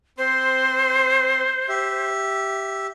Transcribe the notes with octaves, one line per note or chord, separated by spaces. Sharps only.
C4 C5 C6
G4 E5